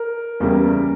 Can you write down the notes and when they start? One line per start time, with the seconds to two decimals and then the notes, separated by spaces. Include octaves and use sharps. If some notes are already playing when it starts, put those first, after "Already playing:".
Already playing: A#4
0.40 E2 C#3 G3 A#3